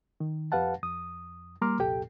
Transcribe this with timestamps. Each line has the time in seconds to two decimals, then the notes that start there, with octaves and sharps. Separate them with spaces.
0.20 D#3
0.52 F2 G4 B4 F5 F#5 A5
0.83 F2 D#6
1.61 G3 A#3 A#5 C6 D6 F6
1.79 C2 F2 A#2 G4 A4 G5